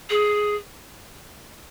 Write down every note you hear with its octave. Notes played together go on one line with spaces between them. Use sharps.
G#4